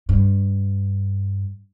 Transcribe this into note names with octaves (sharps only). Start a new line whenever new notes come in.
G2